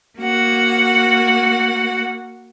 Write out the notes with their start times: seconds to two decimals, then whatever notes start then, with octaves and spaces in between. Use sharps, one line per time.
0.17 A#3 F#4 F#5